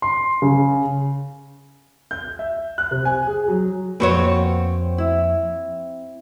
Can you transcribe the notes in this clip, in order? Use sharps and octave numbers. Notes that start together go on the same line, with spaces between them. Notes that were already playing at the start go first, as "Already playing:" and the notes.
C6
C#3
G6
E5
F#6
C3
G#5
G#4
F#3
F2 A#3 C4 F#4 B4 C#5
E4